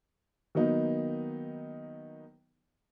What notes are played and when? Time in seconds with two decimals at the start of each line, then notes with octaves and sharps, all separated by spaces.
0.55 D#3 F#3 A#3 B3 D#4